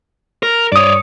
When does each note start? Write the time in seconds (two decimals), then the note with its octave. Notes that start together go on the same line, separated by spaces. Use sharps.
0.43 A#4
0.72 G2 C#5 D5 D#6